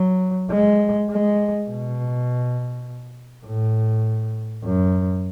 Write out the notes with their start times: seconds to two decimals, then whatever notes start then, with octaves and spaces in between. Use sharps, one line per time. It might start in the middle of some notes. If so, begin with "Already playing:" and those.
Already playing: F#3
0.51 G#3
1.10 G#3
1.69 B2
3.46 A2
4.64 F#2